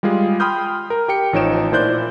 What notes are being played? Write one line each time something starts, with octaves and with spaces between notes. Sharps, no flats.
G3 G#3 F4 G#4
G5 B5 C6 D#6 F6 G6
A#4
G4 G5 C#7
A1 F3 D#4 C#5 D7 E7
A#2 E4 C5 D5 F#6 G6